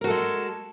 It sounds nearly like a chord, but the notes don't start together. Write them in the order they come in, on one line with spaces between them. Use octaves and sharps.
A#4 F#4 A4 G#3